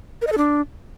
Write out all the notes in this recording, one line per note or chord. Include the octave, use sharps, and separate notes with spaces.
A#4
D#5
A4
D4